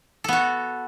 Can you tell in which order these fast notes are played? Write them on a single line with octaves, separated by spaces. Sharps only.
A4 B3 F#4